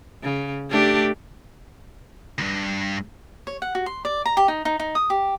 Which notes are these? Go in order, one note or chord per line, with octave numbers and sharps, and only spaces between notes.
C#3
A3 D4 G4
D2 G2
C#5
F#5
F#4
C6
D5
A#5
G4
D#4
D#4
D#4
D#6
G4